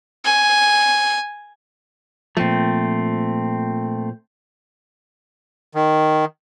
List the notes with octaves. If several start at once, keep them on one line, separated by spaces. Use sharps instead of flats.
G#5
A#2 F3 A3 C4
D#3